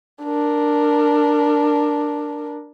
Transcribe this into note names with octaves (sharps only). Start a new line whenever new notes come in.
D4 A#4